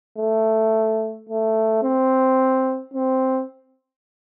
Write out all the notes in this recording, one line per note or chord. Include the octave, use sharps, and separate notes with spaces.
A3
A3
C4
C4